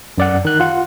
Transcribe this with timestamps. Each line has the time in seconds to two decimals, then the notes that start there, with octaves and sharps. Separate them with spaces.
0.18 F#2 D5 F#5
0.45 D#3 F#6
0.60 F4 F#5